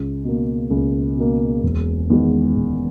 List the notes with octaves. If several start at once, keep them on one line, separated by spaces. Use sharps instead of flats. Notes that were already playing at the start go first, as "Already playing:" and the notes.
Already playing: C#2
B2 A#3
C#2
B2 A#3
E1
E2 D#3 G#3
E1